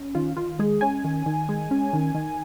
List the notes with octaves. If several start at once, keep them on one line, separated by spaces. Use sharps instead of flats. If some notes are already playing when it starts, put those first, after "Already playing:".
Already playing: C#4
D#3 F4
D#3 F4
G#3 G#4
C#4 G#5
D#3
D#3
G#3
C#4
D#3
D#3